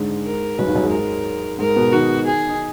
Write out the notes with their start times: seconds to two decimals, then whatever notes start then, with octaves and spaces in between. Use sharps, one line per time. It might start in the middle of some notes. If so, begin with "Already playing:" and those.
Already playing: G#2 D3 G#3 D4
0.25 A#4
0.58 F#2 F#3 B4
0.66 D#2 D#3
0.75 F#2 F#3
0.83 G#2 G#3
0.92 A#4
1.59 G#2 G#3 A#4
1.76 B2 B3
1.92 D#3 D#4 F#4
2.27 G#4
2.49 D#4